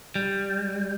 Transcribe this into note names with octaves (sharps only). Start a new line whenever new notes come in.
G3